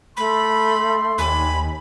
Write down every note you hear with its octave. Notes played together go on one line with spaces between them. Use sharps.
A3 B5 C6
D#2 D4 G5 G#5 B5